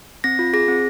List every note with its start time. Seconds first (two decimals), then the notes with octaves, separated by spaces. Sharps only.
0.24 C4 A#6
0.39 F4
0.53 G#4 A#6
0.68 C4